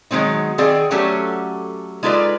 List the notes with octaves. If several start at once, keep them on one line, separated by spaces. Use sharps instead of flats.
D#3 F#3 G#3 C4 D#4
D#3 C4 G#4 D5 G5
F#3 A3 C#4 G4 A4
G#3 D#4 F4 A4 B4 D5